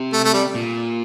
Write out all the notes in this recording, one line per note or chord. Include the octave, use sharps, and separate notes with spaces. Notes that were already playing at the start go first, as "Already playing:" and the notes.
Already playing: C3
A3
A3
G3
A#2